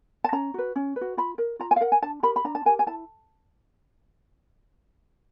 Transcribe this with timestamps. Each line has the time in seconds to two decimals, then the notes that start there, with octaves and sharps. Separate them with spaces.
0.24 A5
0.32 C#4 A#5
0.54 F#4 B4
0.76 C#4
0.96 B4
1.01 F#4
1.17 F4 B5
1.38 A#4
1.59 F4 A#5
1.71 G#5
1.76 F5
1.81 A#4 F#5
1.92 G#5
2.02 D4 A5
2.23 G4 A#4 B5
2.36 B5
2.44 D4 A#5
2.55 A5
2.65 G4 A#4 G#5
2.79 G#5
2.87 E4 A5